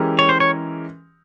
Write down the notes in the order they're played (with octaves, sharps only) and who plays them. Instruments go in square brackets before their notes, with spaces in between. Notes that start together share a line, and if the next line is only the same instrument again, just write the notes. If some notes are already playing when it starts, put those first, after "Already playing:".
Already playing: [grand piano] E3 G#3 C#4 G4 A#4
[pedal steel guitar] C#5
C5
C#5